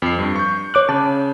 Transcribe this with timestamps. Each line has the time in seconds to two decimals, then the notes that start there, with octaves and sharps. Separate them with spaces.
0.02 F2 C7
0.19 G2
0.36 C#6 G6
0.74 C#5 D6 F#6
0.89 C#3 A5